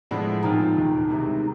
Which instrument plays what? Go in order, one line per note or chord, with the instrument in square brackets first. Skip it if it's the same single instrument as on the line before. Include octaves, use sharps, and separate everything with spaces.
[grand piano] A2 F3 G#3 B3 D4
[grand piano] A#2 F3 G#3 C4 F4 [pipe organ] D#4
[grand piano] E1 D#2 D#3
C2 C3 D#3 G#3